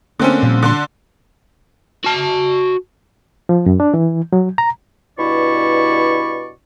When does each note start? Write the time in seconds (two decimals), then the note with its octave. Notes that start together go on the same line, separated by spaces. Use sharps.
0.20 D3 A3 A#3 C4 C#4
0.43 A#2 F3 G3
0.63 D3 C6
2.04 F#4 A5
3.49 F3
3.66 F#2
3.80 D4
3.94 E3
4.33 F#3
4.58 A#5
5.18 G2 B2 E4 D5 C#6